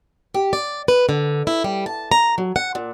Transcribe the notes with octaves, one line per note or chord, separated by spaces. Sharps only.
G4
D5
B4
D3
E4
G3
A5
A#5
F#3
F#5
A#2